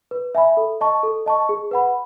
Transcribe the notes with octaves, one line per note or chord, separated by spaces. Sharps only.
B4
E5 G#5 B5
A4
D#5 A5 C#6
A4
D#5 A5 C#6
G#4
B4 F#5 B5